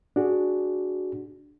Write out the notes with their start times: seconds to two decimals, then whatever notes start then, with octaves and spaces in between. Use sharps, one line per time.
0.16 D4 F#4 G#4